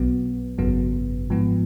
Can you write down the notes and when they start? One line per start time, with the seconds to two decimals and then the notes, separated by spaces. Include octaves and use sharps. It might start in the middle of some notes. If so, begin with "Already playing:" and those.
Already playing: B1 B2 F#3 B3
0.58 G#1 F#2 C#3 F#3 B3
1.30 G#2 F3 B3